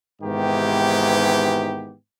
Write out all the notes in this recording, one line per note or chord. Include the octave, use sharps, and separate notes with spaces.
G#2 C3 D#3 E3 B3 G4